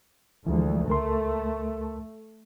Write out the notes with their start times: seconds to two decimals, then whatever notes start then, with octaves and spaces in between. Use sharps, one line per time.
0.47 D2 E3 F3 G#3
0.88 C#2 A3 A#4 C6